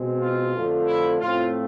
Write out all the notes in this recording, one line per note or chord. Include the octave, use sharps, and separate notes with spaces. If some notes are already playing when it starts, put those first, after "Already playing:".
Already playing: B2 G#3 C4
F4
F2 D3 F3 A3
E4
A2 F3 A3 C4 F4